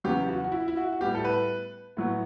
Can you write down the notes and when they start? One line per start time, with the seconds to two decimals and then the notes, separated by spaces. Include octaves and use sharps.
0.04 E2 C#3 F#3 B3 G4
0.28 F#4
0.44 F#4
0.52 E4
0.68 E4
0.77 F#4
0.92 F#4
1.01 A2 G3 B3 G4
1.15 A4
1.24 B4
1.97 A2 F#3 B3